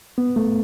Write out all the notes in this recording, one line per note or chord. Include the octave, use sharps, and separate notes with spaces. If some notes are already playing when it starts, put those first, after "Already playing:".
B3
A3